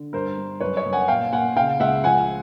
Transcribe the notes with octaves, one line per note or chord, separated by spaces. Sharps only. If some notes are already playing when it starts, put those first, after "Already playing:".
Already playing: D3
G2 A#4 C5
G2
F#2 B4 C#5
C#5 D#5
F#2
F#5 G#5
A#2 F5 G5
A#2 F#5 G#5
C#3 F5 G5
C#2 E5 F#5
F3 F#5 G#5